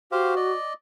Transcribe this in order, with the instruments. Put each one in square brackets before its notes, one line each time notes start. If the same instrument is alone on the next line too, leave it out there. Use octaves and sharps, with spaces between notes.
[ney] F#4 [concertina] G4 C5 F5
[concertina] D5 D#5